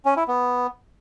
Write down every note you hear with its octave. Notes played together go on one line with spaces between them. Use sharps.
C#4
E4
B3